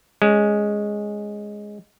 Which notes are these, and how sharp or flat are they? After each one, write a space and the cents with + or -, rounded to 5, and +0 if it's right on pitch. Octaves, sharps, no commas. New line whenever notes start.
G#3 +0 C#4 +0